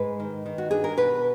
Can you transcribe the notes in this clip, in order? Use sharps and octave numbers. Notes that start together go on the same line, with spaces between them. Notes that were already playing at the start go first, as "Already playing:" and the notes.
Already playing: G#2 G#3 B4
D#3
D#3
F#4
D4 G#4
A#4
B2 B4